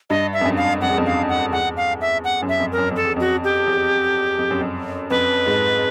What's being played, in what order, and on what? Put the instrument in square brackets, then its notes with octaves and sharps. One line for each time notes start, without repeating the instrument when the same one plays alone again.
[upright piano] G2 [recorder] D#5
[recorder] E5
[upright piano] F2
F#2
[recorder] F5
[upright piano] F2 [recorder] F#5
[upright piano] E2
F2
[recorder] F5
F#5
[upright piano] E2 [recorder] F#5
[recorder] F5
E5
F#5
[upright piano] F#2
[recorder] E5
[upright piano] F2
[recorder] A#4
[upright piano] F#2
[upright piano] F2 [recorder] A4
[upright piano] E2
[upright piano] F2 [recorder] F#4
[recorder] G4
[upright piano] E2
F2
F#2
F2
[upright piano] F2 [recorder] B4
[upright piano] G#2